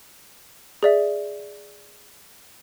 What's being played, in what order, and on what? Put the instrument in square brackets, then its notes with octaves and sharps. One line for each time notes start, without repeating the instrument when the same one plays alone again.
[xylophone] G#4 D5 E5